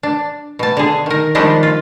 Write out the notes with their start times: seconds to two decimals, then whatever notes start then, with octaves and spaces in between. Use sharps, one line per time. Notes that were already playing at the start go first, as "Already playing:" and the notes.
0.03 D4
0.59 B2 A5
0.77 D3 G#4
1.06 D#3 A#4
1.35 D#3 F3 G3 G#3 D4 G4
1.63 F4